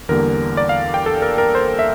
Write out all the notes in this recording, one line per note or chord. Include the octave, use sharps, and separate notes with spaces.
E2 D3 G3 A#3 A#4
D5
F5
G5
A4
A#4
A#4
C5
E5